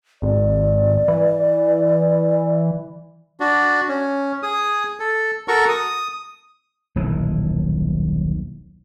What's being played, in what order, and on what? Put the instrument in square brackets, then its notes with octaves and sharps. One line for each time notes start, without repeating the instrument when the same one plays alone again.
[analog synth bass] G#1 [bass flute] D5
[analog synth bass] E3
[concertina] D4 F#4
C#4
G#4 D#6
A4
F#4 A4 A#4 C#6
D#6
[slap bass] D#1 B1 E3